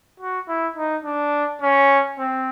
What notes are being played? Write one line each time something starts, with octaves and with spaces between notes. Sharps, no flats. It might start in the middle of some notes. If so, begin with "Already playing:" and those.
F#4
E4
D#4
D4
C#4
C4